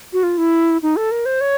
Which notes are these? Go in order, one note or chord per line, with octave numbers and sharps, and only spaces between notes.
F#4
F4
E4
D#4
A4
A#4
C5
C#5